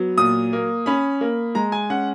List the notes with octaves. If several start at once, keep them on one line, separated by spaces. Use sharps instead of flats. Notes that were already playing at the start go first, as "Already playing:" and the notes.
Already playing: F#3 B3
A#2 D#6
A#3
C#4 B5
A#3
G#3 A#5
G#5
C#4 F#5